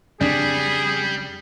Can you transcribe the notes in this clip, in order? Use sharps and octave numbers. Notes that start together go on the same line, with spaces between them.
F2 C#3 G3 C4 D4 G#4